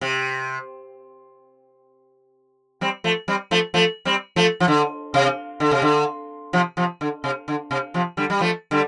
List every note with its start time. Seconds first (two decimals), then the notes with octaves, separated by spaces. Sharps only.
0.01 C3
2.81 G3 C4
3.04 F3 A3
3.28 G3 C4
3.51 F3 A3
3.74 F3 A3
4.05 G3 C4
4.36 F3 A3
4.60 F3
4.68 D3
5.14 C3
5.60 D3
5.71 C3
5.82 D3
6.53 C3 F3
6.77 C3 F3
7.01 D3
7.24 C3
7.48 D3
7.71 C3
7.94 C3 F3
8.17 D3 G3
8.30 G3
8.40 F3 A3
8.71 D3 G3